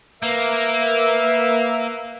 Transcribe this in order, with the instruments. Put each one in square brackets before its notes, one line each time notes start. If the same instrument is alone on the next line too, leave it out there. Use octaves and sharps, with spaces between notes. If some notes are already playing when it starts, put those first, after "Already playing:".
[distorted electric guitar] A#3 [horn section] A#4 B4 E5